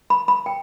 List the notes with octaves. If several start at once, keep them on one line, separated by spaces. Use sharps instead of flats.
B5
B5
G5